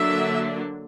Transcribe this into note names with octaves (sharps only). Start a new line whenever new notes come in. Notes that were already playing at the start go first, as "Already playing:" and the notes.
Already playing: D3 F#3 A#3 D4 E5